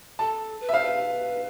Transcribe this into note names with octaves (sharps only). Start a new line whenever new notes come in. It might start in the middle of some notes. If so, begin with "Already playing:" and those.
A4 A5
B4
E5
C5 F5
B4